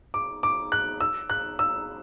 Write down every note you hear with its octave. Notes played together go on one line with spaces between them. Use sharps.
D6
D6
F#6
E6
F#6
E6